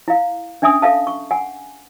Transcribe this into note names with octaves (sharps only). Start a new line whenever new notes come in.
E4 F5
C#4 D4 E5 G#5 D#6
A4 E5 F5 A5
C#6
F#5 G#5